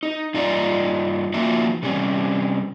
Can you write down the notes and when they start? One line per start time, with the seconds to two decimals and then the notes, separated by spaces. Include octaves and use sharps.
0.03 D#4
0.34 G2 D#4 F4 D5 A#5
1.34 F3 A#3 D#4 F4 F#4 E5
1.83 C3 G3 C#4